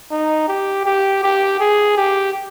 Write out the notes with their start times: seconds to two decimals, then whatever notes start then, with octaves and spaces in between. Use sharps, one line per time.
0.11 D#4
0.48 G4
0.85 G4
1.23 G4
1.60 G#4
1.97 G4